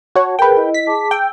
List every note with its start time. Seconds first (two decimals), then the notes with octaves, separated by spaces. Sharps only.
0.15 F#4 C#5 A5
0.39 G#4 A#4 B4 G5
0.57 E4 D#5
0.74 B6
0.87 G#4 A5 D6
1.11 G5 E6